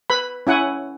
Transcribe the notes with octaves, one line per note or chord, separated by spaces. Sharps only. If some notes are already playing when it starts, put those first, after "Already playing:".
B4 B5
C#4 E4 F#5 G#5